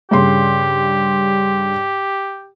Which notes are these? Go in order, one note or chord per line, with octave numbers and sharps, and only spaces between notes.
G2 C#3 G4 C6